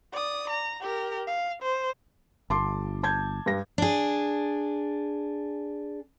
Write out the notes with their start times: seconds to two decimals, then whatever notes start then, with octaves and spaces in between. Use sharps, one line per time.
0.13 D5 D#6
0.50 A#5
0.81 G4 A#4
1.27 F5
1.62 C5
2.50 G1 A5 C6 D6
3.03 A5 G6 G#6
3.46 G2 A#6
3.78 D4 G#4